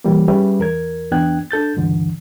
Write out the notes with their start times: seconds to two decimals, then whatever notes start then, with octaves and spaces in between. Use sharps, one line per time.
0.04 A#2 E3 G3 A#3
0.28 G3 C#4 G#4 B4 C#5 E5
0.59 E2 A#4 G#6
1.12 E2 B3 D4 G5 F#6 G#6
1.51 D4 A4 G6 A6
1.77 C#2 G2 D3 E3